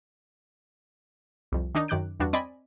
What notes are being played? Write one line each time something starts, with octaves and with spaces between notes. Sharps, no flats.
C2 F2
D#3 D4 D#4
F#2 D#3 D6 F#6 G6 D7
E2 G2 D4 F#4
C4 D5 D#5 G#5 B5